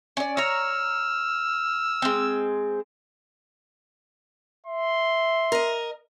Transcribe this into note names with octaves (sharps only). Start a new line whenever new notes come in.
C#4 D5
C#5 A#5 E6 F6
G#3 C4
E5 C6
A#4 D#5